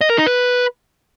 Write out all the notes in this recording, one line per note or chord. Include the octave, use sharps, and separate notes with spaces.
D#5
A#4
D#4
B4